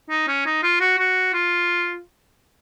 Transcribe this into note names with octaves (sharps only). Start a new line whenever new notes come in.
D#4
C#4
D#4
F4
F#4
F#4
F4